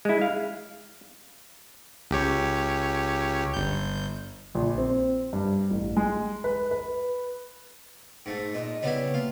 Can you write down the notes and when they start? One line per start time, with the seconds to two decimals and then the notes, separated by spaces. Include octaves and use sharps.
0.05 G#3 E4
0.21 F5
2.11 C#2 G4 C#5
3.54 G1 G6
4.55 A#1
4.78 C4
5.33 G2
5.71 A1
5.97 G#3
6.44 B4
6.71 B4
8.26 G#2 A3
8.54 A#2 D#5
8.83 C#3 G3 B3 E4 C#5
9.14 A#3 F4